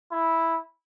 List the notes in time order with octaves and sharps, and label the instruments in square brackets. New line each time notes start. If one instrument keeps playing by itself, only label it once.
[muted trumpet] E4